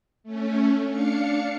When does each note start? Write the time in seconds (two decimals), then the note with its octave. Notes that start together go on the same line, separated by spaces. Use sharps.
0.24 A3 C#4
0.88 D4 F5 C#7